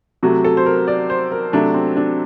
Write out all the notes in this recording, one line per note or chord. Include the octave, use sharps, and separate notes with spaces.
C3 F#3 A3 F#4
A4
C5
A#4
D5
C5
A#4
C3 F#3 A3 D4
C4
D4